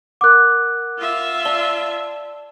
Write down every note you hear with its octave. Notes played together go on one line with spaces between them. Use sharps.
A#4 F#5 D6 F#6
F4 E5
D5 A5 G7